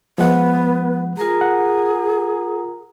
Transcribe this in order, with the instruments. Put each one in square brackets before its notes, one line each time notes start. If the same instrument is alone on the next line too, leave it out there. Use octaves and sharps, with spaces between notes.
[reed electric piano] F3 G#3 F#5 [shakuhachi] B3
[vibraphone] F4 A#4 A#5 [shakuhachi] G#4
[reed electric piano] F#5